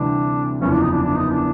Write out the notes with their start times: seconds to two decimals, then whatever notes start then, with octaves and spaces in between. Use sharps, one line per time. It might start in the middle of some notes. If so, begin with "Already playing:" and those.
Already playing: D2 C3 E3 G3 C4 D4
0.61 F#1 E2 C#3 F3 C#4
0.72 D4
0.82 D#4
0.92 D4
1.02 D4
1.16 D#4
1.29 D4